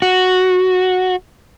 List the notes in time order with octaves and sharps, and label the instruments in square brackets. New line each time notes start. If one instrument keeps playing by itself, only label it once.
[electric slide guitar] F#4